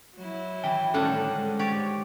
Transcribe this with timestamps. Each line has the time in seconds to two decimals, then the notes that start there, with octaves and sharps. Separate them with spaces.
0.15 F#3 E4
0.64 E3 G5
0.94 A2 D3 D#3 G3 C#4 D4 A4 F#5
1.29 G#2
1.59 G4 C#5 D5